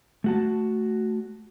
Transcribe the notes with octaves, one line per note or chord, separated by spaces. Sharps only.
A3 F#4 A5